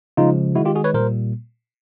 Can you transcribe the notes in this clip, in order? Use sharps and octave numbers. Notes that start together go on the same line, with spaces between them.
C#3 F3 G#3 D#4 F4
D#3 G#3 E4 F#4
F4 G4
F#4 G#4
B4 C#5
A#2 G3 A#3 A#4 C5